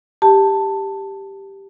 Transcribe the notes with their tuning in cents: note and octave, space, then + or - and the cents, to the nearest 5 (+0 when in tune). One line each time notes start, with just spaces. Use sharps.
G4 +0 A5 +10